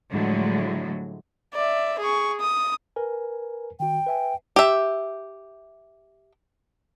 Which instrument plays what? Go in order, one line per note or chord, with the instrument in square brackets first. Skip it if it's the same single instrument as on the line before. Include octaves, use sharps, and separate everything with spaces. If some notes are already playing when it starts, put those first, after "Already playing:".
[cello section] A2 D3 F3 F#3 G#3
[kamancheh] D5 E5
G#4 C#6
D#6
[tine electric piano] A#4 B4 G#5
[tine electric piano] D#3 F#4 [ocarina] G5
[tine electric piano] B4 E5 G#5
[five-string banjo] G4 E5